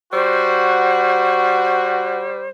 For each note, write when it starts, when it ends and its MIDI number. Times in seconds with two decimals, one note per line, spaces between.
0.13 2.49 55
0.13 2.31 66
0.13 2.49 72